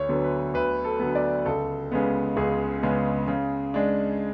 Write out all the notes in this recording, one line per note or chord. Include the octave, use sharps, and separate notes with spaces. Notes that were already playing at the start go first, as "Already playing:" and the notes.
Already playing: D2 C#5
D3 F#3 B3
B4
D2 B4
A4
D3 F#3 B3
D5
C#2 A4
C#3 G#3 B3
C#2 G#4
C#3 G#3 B3
C#3
G#3 D4